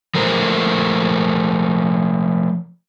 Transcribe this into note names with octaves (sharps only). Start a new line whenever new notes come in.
F3 A3 A#4 C5